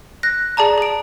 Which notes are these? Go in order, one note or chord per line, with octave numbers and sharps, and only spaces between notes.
F#6 A#6
G#4 D5 A5 A#5
G#4 D7